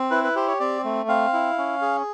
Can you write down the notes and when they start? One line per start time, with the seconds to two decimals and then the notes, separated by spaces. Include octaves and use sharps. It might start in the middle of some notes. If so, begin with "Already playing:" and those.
Already playing: C4
0.11 E4 B4
0.24 B4
0.35 G4 C5
0.47 C#5
0.60 C4 D5
0.84 A3
1.08 C4 F5
1.33 E4
1.58 C#4
1.82 G#4